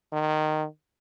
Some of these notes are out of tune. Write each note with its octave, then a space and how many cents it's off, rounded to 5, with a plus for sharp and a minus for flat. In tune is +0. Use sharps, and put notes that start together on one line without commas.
D#3 -15